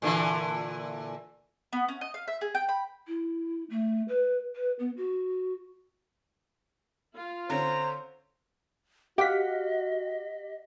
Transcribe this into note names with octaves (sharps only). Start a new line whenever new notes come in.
A#2 D3 E3
B3
C#4
D#5
F5
E5
G#4
G5
B5
E4
A3
B4
B4
B3
F#4
F4
D3 C4 C#4 C5 A#5
F#4 G4 D#5 F5 F#5 B6